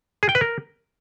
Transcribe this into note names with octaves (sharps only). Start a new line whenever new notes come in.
G#4
G5
B4
A#4